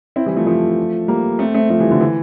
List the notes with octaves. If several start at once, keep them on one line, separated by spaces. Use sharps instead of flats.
C4 E4
E3 G3
F3 A3
F3 A3
G3 A#3
A3 C4
A3 C4
F3 A3
E3 G3
D3 F3
E3